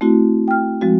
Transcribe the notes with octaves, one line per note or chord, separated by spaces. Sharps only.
A3 C4 E4 F#4
G5 F6
F3 G#3 C4 F#4